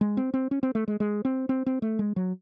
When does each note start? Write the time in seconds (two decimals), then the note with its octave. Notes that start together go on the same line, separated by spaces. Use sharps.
0.01 G#3
0.17 C4
0.34 C4
0.51 C#4
0.63 C4
0.75 A3
0.88 G#3
1.00 G#3
1.25 C4
1.49 C4
1.66 C4
1.82 A3
1.99 G#3
2.16 F#3